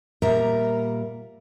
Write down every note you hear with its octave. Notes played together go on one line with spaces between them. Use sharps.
A#2 G3 A#4 E5 A#5